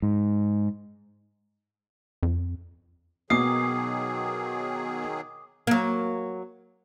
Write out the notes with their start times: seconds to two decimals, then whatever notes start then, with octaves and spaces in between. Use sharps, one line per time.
0.02 G#2
2.23 F2
3.30 B2 D#3 F#3 G#4 D6 D#6 C7
5.67 F#3 A#3